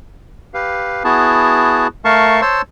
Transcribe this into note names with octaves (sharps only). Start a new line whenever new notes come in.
G4 B4 F5
B3 E4 F#4 G#4 A5
A3 A#4 F5 A5 C#6
C5 C#5 A5 C6 E6